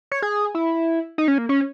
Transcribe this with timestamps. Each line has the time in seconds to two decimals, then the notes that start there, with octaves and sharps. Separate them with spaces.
0.12 C#5
0.22 G#4
0.55 E4
1.18 D#4
1.28 C#4
1.38 A#3
1.49 C#4